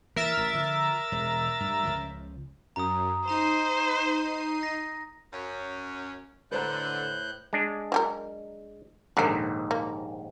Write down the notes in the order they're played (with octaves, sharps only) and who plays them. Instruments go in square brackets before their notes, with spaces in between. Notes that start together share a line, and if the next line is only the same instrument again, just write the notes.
[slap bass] E3 A#3 [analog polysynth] A#4 E5 A6
[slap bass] A1
D3 F3
E1 G#3
G2 G3
C#2 C#3 F3
[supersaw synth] F#2 [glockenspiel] A#5 D#6
[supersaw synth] D#4 C7 D#7 [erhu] C5 [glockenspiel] A#5
[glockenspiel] A#6
[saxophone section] F#2 C#4
[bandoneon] A2 F#6 G6 [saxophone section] D3 [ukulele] B4 C5 A#5
[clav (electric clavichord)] G#3 D4
[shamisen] F#3 G4 A#4
[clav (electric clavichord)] A#1 D#2 G#2 [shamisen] D3 A#4
[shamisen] A#3